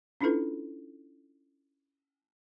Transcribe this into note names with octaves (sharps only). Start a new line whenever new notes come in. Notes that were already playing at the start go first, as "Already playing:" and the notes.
C#4 D4 E4 F4 A4 B4